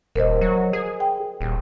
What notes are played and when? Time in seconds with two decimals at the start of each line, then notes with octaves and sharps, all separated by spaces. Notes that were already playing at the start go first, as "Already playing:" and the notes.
0.15 D#1 A#4 C5 D#5
0.41 F#3
0.73 G#4
1.00 G5
1.41 D#1